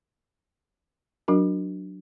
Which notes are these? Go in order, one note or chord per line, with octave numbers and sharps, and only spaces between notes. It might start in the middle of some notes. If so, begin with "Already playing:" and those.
F#3 D4 F#4 A#4